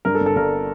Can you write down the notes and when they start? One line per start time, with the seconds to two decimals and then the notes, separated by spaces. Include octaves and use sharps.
0.05 G2 A#4
0.15 A4
0.21 G1
0.26 A4
0.36 G1 A#4